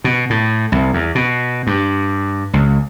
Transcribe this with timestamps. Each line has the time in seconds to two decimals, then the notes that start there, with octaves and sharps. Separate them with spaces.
0.04 B2
0.30 A2
0.72 C2
0.94 E2
1.15 B2
1.67 G2
2.53 C#2